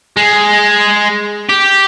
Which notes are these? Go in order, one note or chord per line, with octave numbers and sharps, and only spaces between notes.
G#3
G4